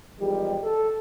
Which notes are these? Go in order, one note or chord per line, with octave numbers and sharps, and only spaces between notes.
E2 D#3 F3 G3 G#3 G4
A4